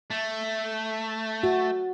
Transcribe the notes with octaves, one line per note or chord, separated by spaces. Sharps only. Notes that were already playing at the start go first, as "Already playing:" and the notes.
A3
F#4